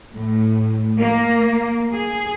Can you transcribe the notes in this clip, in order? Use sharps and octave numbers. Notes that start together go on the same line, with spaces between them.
A2
A#3
G#4